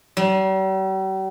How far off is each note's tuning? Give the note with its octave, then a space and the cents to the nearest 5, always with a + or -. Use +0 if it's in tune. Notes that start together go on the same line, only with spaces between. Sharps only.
G3 -45